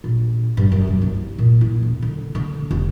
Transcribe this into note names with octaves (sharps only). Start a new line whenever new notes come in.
A#1
G2
F#2
C3
C2
A#2
E4
E1
D3
D3
F1